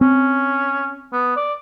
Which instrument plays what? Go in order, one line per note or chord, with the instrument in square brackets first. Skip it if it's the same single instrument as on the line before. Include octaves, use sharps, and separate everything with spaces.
[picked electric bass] C4 [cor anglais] C#4
[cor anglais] B3
D5